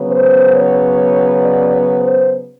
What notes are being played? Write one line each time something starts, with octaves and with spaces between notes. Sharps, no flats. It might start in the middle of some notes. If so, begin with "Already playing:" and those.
Already playing: C#3 F#3 B3
C5
C#5
D5
C#5
C5